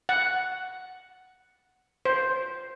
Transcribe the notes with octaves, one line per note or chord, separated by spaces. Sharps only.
F#5
C5